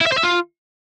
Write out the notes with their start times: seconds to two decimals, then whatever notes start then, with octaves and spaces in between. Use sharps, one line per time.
0.01 E4
0.07 E5
0.12 C5
0.18 E5
0.23 F4